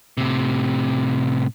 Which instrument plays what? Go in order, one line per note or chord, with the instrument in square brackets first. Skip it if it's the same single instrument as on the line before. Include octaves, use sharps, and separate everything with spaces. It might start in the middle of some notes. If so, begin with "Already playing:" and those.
[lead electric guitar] A2 C3